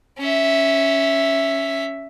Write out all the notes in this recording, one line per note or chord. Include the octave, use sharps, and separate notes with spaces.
C#4 E5